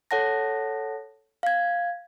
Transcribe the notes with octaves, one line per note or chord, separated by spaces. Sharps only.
A4 C#5 F#5 A5 A#6
F5 G#6